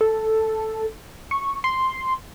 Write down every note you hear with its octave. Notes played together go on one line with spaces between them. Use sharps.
A4
C#6
C6